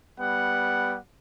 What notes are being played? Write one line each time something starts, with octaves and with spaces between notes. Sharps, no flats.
G3 B3 F#5